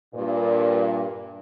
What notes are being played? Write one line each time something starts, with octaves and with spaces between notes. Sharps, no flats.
G2 A#2